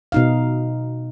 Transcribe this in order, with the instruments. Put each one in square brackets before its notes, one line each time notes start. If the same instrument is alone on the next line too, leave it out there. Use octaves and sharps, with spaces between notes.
[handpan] B2 D#4 F5